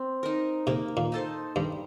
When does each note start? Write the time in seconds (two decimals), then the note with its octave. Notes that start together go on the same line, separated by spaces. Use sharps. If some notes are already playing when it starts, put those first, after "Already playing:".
Already playing: C4
0.23 D#4 A#4
0.67 C3 A#3
0.97 A#2
1.12 D#4 A4 C5
1.56 G2 G3